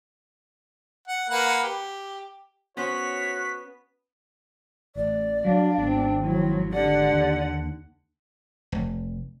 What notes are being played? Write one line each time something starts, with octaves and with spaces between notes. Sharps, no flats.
F#5
A#3 B4 F#5
G4
B3 C#4 F#4 C5 C#5 B6
A1 D5
F#3 D4 F5
G#1 B3 C4
F3 F#3 E4
D3 G4 D5 F#5
D#2
F1